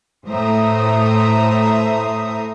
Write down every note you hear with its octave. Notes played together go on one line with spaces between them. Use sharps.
A2 A3 C5 E5 A#5 D#6